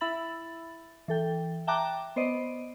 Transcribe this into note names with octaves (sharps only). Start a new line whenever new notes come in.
E4 E5 B5 A6 F#7
E3 A4 G5
E5 G5 A5 A#5 D6 F#6
B3 C5 D5 D#5